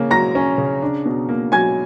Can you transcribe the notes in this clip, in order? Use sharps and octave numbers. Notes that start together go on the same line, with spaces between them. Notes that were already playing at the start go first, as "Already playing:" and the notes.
Already playing: C#3 A#3 C#4
F#3 A#5 A#6
C#4
C#3
D4
B2
A#3
F#3 G#5 G#6